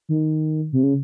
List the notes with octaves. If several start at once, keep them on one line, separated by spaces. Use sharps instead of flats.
D#3
C3
C#3